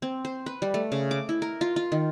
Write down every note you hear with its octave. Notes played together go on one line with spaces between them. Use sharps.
C4
C5
B4
G3
A3
C#3
D6
E4
A#4
F4
F4
D#3